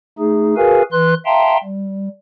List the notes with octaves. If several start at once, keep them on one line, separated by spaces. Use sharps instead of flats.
A3 D#4 G#4
F#4 G#4 A#4 B4 F5 G#5
E3 B4 C6 F#6
E5 F5 G5 A5 A#5 C6
G3